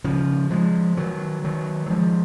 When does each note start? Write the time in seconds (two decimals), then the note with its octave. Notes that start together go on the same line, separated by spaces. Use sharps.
0.04 C#3 F3
0.51 F3 G#3
0.97 D#3 F#3
1.44 D#3 F#3
1.86 F#3
1.90 F3 G#3